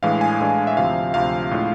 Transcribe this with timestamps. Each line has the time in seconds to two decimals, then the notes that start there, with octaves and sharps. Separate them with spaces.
0.03 A2 E3 G#3 D4 F5
0.21 G#5
0.41 A2 E3 G#3 D4
0.67 E5
0.77 D2 C3 F3 F5
1.14 D2 C3 F3 F5
1.51 A2 G#3 D4 F4